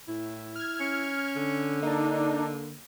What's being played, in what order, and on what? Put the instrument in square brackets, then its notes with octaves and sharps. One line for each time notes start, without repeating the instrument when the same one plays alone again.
[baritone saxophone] A2 [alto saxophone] E4
[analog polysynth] F6 G#6
[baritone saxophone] C#4
[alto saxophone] D3
[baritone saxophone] A#3 [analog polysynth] D4 D#4